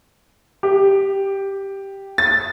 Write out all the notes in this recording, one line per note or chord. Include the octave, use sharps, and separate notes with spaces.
G4
A6